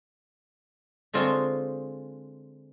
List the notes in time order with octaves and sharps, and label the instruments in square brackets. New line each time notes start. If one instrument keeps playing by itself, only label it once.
[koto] D3 G#3 C4 F4 C5 C#5